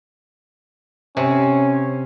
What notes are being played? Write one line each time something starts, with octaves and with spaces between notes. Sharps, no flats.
C3 C#4